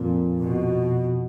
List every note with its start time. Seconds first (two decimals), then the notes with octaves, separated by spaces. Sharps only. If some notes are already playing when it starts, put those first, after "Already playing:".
Already playing: F2 A#2
0.40 B2